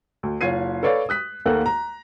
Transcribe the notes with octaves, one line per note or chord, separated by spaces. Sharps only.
D2
F#1 F4 C#5 G#6 C7 D#7
A4 B4 C#5 D5 F5
D#6 F#6 B6
D#2 A3 A#3 A4 F#5 F#6
A#5